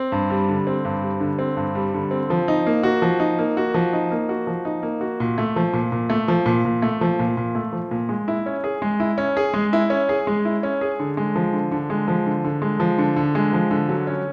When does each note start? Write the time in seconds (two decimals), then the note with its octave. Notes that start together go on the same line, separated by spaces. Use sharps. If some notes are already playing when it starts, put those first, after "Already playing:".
Already playing: C4
0.12 G2
0.30 G3
0.49 D3
0.67 C4
0.85 G2
1.02 G3
1.20 D3
1.39 C4
1.57 G2
1.75 G3
1.94 D3
2.11 C4
2.30 F3
2.48 D#4
2.67 A#3
2.83 F#4
3.02 F3
3.20 D#4
3.39 A#3
3.57 F#4
3.74 F3
3.93 D#4
4.11 A#3
4.29 F#4
4.47 F3
4.65 D#4
4.83 A#3
5.01 F#4
5.20 A#2
5.38 A3
5.56 F3
5.73 A#2
5.92 A#2
6.10 A3
6.28 F3
6.46 A#2
6.65 A#2
6.82 A3
7.01 F3
7.19 A#2
7.37 A#2
7.55 A3
7.73 F3
7.91 A#2
8.09 G#3
8.28 E4
8.46 C#4
8.64 G#4
8.82 G#3
9.00 E4
9.18 C#4
9.37 G#4
9.54 G#3
9.73 E4
9.90 C#4
10.09 G#4
10.27 G#3
10.45 E4
10.63 C#4
10.81 G#4
10.99 D3
11.17 G#3
11.36 F3
11.53 D3
11.71 D3
11.90 G#3
12.08 F3
12.26 D3
12.44 D3
12.62 G#3
12.80 F3
12.98 D3
13.16 D3
13.35 G#3
13.53 F3
13.71 D3
13.89 F#3
14.07 C#4